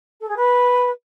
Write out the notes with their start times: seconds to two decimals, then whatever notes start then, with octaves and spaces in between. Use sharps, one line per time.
0.20 A4
0.28 G#4
0.36 B4